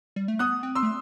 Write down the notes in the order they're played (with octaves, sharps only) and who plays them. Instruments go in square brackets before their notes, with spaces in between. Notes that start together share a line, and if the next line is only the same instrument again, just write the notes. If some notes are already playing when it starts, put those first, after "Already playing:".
[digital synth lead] G3
A3
[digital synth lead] B3 [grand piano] D#6 F#6
[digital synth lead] C4
[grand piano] C6 E6
[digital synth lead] A3